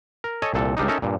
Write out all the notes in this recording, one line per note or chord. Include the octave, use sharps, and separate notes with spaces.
A#4
A4 C#5 D#5 G#5
C2 A#2 A4
C#2 G3 D4 D#4
C#4 D#4 A4 A#4 E5
G2 A#2